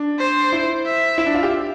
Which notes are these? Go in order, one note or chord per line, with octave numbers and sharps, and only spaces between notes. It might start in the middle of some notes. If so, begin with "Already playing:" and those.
Already playing: D4
C5
E4
E5
E4
D4
F4
G4